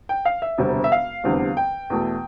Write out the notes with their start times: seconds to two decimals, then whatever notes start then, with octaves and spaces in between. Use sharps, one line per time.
0.09 G5
0.25 F5
0.42 E5
0.58 E1 D2 C3 G3 C4
0.84 E5
0.92 F5
1.24 F1 E2 D3 G3 C4
1.57 G5
1.90 E2 B2 A3